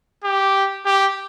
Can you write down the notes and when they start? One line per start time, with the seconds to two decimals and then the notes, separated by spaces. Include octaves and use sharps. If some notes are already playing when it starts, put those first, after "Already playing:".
0.24 G4
0.85 G4